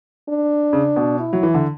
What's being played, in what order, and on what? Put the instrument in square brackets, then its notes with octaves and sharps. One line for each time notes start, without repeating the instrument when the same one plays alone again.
[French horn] D4
[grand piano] C#3
B2
[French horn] E4
[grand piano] F#3
E3
D3